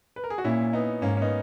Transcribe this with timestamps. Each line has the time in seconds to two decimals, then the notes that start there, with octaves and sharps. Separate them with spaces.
0.16 B4
0.24 A#4
0.30 G#4
0.38 F#4
0.44 A#2 C#4 E4
0.73 B3 D#4
1.02 G#2 A#3 C#4
1.17 C#4
1.21 B3 D#4